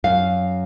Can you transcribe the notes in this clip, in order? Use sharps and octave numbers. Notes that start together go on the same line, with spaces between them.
F#2 F5